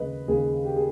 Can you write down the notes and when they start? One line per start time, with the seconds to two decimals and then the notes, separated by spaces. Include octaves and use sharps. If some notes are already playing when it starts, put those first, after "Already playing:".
Already playing: D#2 C#3 G#3 B4 D#5
0.28 D#2 C#3 G#3 G#4
0.65 G4
0.76 G#4